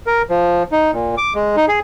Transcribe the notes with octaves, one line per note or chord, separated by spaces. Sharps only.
A#4
F3
D#4
A#2
D6
G#3
D#4
G#4